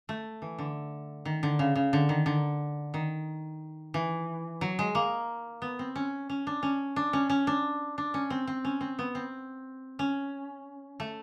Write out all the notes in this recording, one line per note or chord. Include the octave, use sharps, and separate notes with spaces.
A3
E3
D3
D#3
D3
C#3
C#3
D3
D#3
D3
D#3
E3
F#3
G#3
A#3
B3
C4
C#4
C#4
D4
C#4
D4
C#4
C#4
D4
D4
C#4
C4
C4
C#4
C4
B3
C4
C#4
A3